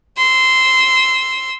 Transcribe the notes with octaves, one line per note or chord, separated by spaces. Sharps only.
C6 E6